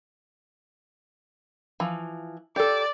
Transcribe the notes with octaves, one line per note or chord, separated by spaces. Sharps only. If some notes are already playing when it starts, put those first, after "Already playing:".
E3 F3
G4 A4 D5